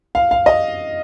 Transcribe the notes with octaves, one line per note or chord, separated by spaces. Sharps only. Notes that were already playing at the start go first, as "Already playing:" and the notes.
F5
F5
D#5